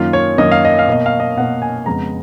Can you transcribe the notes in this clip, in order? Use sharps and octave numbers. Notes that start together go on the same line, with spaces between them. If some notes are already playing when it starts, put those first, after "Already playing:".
Already playing: F#2 D#3 A#3 F4
C#5
F#2 D#3 A#3 D#5
F5
D#5
F5
B2 A#3 D#5
F5
D#5
B2 A#3 F#5
G#5
F2 C#3 G#3 B3 A#5